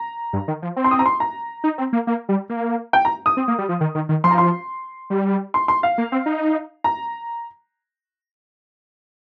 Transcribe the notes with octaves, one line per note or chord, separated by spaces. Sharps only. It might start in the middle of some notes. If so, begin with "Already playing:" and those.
Already playing: A#5
G2
D#3
F3
C4
C6
D#6
A#5
C6
A#5
D#4
C4
A#3
A#3
G3
A#3
G5
A#5
D#6
C4
A#3
G3
F3
D#3
D#3
D#3
F3 C6
A#5
C6
G3
C6
C6
F5
A#3
C4
D#4
A#5